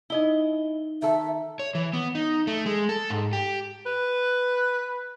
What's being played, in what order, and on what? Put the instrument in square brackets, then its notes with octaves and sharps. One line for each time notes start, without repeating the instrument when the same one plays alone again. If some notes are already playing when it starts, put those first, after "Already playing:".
[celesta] D#4 G7 [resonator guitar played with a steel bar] E4 D#5
[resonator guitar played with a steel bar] D#3 A4 [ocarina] E5
[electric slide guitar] C#5
E3
B3
D#4
A3
G#3
A4
G#2
G4
[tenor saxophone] B4